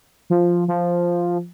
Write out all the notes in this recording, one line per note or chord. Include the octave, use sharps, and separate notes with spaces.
F3
F3